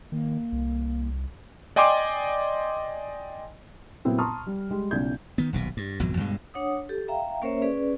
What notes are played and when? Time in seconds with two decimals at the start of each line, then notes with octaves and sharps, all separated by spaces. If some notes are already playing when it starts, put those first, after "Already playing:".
0.12 D#3 A#3
0.52 C2
1.76 D5 D#5 G5 G#5 C6 D6
4.05 A#2 F#3 B3 C4 E4
4.18 A5 A#5 C6 C#6 D#6 F6
4.46 G3
4.70 G3 G#3 G4
4.91 B1 C#3 E4 D5 G6 G#6
5.38 D#3 B3
5.53 D#1 B1 B2
5.77 G2
5.99 G#1 F2 B2 F#3
6.17 C#2 G2 B2 G#3
6.54 D4 C#5 F#5 D#6
6.89 G4 A4
7.08 E5 F5 G5 A#5
7.42 A#3 C#4 A#4 C5 C#5 E5
7.62 C#4 G#4 B4 D5